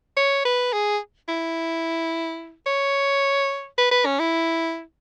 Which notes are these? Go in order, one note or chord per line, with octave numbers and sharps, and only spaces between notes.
C#5
B4
G#4
E4
C#5
B4
B4
C#4
E4